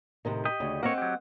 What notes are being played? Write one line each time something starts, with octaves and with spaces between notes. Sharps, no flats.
A2 C3 D#3
G4 D#5
D2 C#3
A#3 C4 A#4 C#5 D#5 F#5
F#3 G4